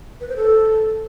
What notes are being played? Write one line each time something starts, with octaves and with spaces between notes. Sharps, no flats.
B4
C5
A4